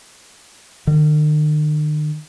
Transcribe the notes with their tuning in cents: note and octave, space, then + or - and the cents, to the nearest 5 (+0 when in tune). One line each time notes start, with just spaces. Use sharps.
D#3 -45